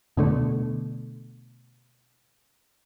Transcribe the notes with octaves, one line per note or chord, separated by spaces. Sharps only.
B2 D3 A3